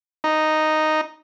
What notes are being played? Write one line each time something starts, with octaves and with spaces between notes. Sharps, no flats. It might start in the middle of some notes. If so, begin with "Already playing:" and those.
D#4